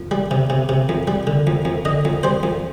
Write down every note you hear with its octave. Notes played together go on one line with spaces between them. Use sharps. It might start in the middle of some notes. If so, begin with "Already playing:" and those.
Already playing: F2
G3
C3
C3
C3
F2
G3
D3
F2
F2
D3 D#5
F2
G3 C5
F2